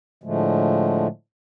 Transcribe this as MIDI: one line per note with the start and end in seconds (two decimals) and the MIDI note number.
0.24 1.07 45
0.24 1.07 50
0.24 1.07 53
0.24 1.07 56
0.24 1.07 57